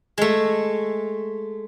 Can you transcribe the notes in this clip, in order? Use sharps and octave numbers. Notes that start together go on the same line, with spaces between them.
G#3 A3